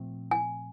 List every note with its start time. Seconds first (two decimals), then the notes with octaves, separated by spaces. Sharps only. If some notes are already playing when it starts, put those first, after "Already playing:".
Already playing: A#2 F3 A3 C4
0.31 G#5